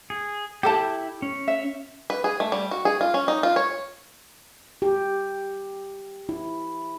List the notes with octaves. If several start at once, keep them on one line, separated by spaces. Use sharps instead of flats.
G#4
E4 G4 A4 G5 A5
C#4
E5
B4
G#4
A3
G3
F#4
G#4
F4
C#4
D#4
F4
C#5
G4
E4